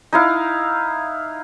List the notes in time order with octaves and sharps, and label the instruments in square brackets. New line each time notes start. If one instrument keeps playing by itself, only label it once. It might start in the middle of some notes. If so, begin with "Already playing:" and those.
[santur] D#4 E4 F5